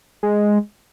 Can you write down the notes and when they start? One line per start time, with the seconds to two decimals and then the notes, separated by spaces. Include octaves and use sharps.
0.23 G#3